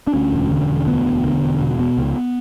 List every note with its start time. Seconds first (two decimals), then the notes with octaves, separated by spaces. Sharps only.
0.07 D4
0.14 D2 C#4
0.32 E1
0.51 D3
0.70 E1
0.87 D2 B3
1.06 E1
1.24 D3
1.43 E1
1.61 B2
1.79 B2
1.97 C#2